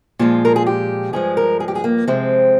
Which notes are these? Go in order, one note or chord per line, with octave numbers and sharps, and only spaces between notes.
A#2 F3 G#3 F4
A#4
G#4
G4
G2 F3 G#3 G#4
A#4
G#4
G4
G#4
A#3
C3 F3 G#3 C4